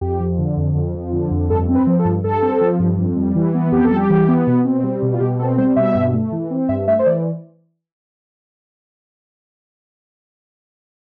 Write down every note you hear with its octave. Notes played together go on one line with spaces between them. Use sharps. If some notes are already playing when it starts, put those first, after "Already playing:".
F2 G4
F3
D3
F2
F2
F3
D3
F2
G2 A4
C4
B4
F3
A4
G2
G2 A4
C4
F3
G2
F2
G3
E3
B3
F2 G4
A4
G3
G4
E3
B3
B2
C4
G3
B2
F4
B2 G4
C4 A4
G3 C5
B2 E5
G2
A3
E3
C4
G2 E5
A3 E5
C5
E3 D5